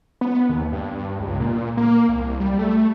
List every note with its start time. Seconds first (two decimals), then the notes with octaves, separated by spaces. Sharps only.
0.21 B3
0.49 D#2
0.72 G2
1.19 C#2
1.40 A#2
1.77 A#3
2.08 C2
2.40 G3
2.59 A3